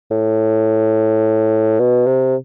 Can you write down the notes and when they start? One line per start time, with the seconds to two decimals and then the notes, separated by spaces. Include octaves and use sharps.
0.11 A2
1.79 B2
2.07 C3